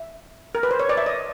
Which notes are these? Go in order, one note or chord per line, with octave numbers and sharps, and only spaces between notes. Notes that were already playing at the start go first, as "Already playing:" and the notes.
Already playing: E5
A#4
B4
C5
C#5
D5
E5
D#5